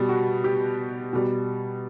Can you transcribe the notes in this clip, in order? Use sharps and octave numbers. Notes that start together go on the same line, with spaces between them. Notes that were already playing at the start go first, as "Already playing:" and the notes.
Already playing: B2 G3
F#4
G4
B2 G3